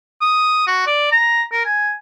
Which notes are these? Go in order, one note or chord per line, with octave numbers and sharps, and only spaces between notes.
D#6
F#4
D5
A#5
A#4
G#5